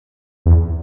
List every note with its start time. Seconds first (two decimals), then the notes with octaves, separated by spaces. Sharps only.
0.46 E2